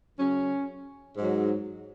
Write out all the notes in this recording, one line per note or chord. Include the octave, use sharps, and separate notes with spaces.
F#2 C#3 F#3 C#4
G#2 F#3